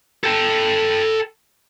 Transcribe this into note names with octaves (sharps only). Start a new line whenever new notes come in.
A4 G5